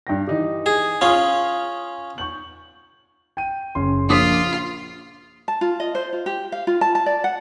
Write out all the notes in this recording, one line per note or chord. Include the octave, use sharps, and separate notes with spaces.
G2 G5 A#6
E3 D#4 G4
G#4
C#4 F4 C6 D#6 F6
C#6 G6 F#7
G5 D#7
F#1 C#4 C6
A#1 F4 D6 D#6 B6
A5
F4
D#5
C5
F4
G4
F5
F4
A5
A5
D5
F#5